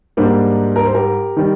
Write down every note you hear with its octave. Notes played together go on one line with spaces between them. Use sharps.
G#2 G3 A#3 D4
A#4
C5
G4 A#4
D#3 G3